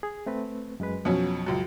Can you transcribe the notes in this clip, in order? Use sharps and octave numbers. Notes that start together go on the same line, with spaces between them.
G#4
A3 C4 B4
F#2 G#3 B4
F2 B2 F3 F#3 C#4
C#2 F#2